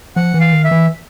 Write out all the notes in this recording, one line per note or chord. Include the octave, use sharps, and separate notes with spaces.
F3 F#5
E3
F5
D#3
E5
E3